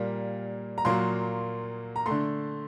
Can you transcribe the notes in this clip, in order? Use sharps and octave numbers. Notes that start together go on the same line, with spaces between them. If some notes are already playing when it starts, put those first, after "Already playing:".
Already playing: A#2 G3 A#3
A#5
A#2 F#3 A#3 C6
A#5
D3 A3 C6